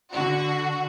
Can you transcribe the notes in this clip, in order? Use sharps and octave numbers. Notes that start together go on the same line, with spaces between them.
D3 F#4